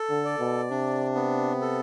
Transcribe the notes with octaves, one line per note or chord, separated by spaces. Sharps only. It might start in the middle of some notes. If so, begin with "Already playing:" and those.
Already playing: A4
D3
D5
B2
C3 D4
B3
A4